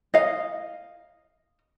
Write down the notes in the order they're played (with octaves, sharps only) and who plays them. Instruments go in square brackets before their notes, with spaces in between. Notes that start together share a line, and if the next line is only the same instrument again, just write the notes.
[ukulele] D#5 F5